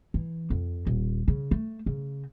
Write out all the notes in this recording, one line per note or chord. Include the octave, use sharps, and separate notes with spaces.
E3
F2
D#1
C#3
A3
C#3